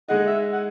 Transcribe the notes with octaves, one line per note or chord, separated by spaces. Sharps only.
G#3 D#4 G#4 D#5 F#5
E5
F#5